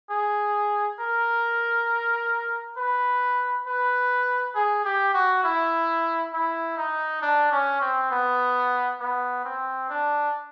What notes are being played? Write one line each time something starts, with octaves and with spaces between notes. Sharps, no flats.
G#4
A#4
B4
B4
G#4
G4
F#4
E4
E4
D#4
D4
C#4
C4
B3
B3
C4
D4